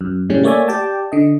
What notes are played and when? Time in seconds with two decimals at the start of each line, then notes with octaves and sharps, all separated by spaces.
0.01 F#2
0.30 A2 C#3 G3 C#4
0.43 A3 A#3 C#5 D5 E5 G#5
0.68 G4 D5 G5 A5
1.12 D3 D#5